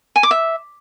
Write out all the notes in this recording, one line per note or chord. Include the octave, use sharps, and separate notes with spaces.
G#5
D6
E5